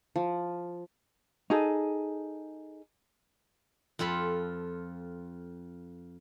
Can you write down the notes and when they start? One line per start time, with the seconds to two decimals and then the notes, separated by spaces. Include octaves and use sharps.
0.16 F3
1.50 D#4 G#4 A4
3.99 F2 F4 A4 B5